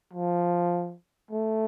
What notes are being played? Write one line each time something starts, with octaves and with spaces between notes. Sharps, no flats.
F3
A3